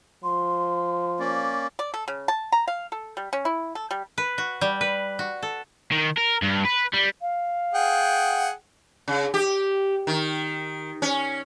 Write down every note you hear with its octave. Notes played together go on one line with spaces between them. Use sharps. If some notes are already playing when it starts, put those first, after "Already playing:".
F3 C6
A#3 C#4 D5
D5
A4
C#3
A5
A#5
F5
A4
G3
C#4
E4
A4
G3
B4
F#4
G3
B4
F#4
A4
D#3
A#4
G2
B4
G3
F5
G#4 F#5 G5
C#3
G4
D#3
C#4